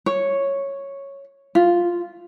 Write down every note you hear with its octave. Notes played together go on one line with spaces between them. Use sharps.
C#5
F4